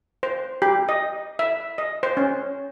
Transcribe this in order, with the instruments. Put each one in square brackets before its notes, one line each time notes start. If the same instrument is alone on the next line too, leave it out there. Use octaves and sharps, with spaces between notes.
[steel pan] C5
G4
D#5
E5
D#5
C5
C#4